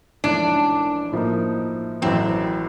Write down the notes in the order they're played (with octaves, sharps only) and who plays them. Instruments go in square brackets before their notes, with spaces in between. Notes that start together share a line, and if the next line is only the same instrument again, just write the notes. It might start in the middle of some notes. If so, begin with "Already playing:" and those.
[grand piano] A#1 G#2 E3 A3 C#4 [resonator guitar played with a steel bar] D4
[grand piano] A2 F3 A#3 D#4
[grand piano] A1 A2 F#3 [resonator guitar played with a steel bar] C4